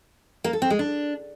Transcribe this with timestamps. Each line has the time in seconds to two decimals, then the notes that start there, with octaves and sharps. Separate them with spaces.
0.44 A#3
0.53 A4
0.62 C4
0.70 G#3
0.79 D4